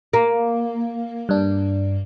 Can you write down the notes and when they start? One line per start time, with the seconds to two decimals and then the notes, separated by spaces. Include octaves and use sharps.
0.13 A#3
1.29 G2 D4